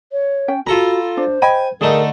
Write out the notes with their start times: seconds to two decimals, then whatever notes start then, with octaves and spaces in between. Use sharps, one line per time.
0.12 C#5
0.48 C#4 G5
0.67 F4 F#4 A4 A#5 B5
1.17 D4 C5
1.42 D#5 G5 G#5 B5
1.81 D3 A3 D#4 G#4 A#4